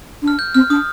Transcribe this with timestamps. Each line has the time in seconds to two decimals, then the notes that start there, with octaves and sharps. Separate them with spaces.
0.23 D4
0.28 F6
0.39 G6
0.54 C4 F6
0.70 D4 D#6